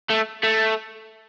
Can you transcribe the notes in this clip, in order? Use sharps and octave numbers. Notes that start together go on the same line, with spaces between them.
A3
A3